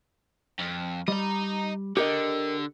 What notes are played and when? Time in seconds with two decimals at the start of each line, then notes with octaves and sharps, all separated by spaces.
0.60 F2
1.08 G3 D#5 A#5
1.97 D3 G4 A#4 D#5